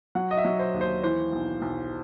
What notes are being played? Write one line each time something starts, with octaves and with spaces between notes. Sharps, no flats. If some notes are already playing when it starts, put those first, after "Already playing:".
F#3 F#5
D#5
E5
F#3
C5
D#2
C5
E3 C5
B1
B1